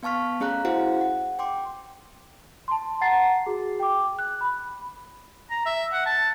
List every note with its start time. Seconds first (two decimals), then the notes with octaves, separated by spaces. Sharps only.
0.03 B3 F5 A5 C#6 F6 B6
0.40 A3 C#4 G#4 F5 A#5 F#6
0.65 E4 F#4 G#4 C5 F5 F#5
1.01 F#5
1.39 G5 C6 D6
2.68 A5 C6
3.01 F#5 A#5 A6 C7
3.46 F#4 G#4
3.80 G5 D6
4.19 F#6
4.41 B5
5.51 A#5
5.66 E5
5.93 F#5
6.06 A5